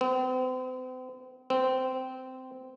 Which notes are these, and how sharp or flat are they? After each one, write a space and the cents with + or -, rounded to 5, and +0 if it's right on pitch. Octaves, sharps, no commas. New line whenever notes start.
C4 -40
C4 -15